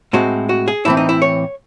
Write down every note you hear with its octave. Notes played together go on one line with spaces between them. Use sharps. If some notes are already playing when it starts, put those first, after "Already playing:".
A2 G#3 C4 F#4
F#4
G#4
A2 E3 C4 E4
D#4
E4
C#5